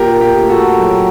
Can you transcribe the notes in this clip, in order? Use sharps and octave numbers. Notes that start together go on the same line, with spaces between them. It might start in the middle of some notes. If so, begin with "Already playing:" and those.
Already playing: A#2 G4 A#4
G4
A3
F#4 A4
F#3